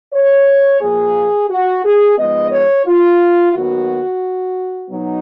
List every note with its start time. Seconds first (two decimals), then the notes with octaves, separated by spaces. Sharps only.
0.14 C#5
0.81 A#2 F3 A#3 G#4
1.49 F#4
1.84 G#4
2.17 G#2 F3 G#3 B3 D#5
2.52 C#5
2.86 F4
3.53 D#2 D#3 F#3 B3 F#4
4.90 B2 F#3 B3 D#4